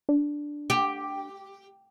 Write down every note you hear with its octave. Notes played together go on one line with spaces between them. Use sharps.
D4
G4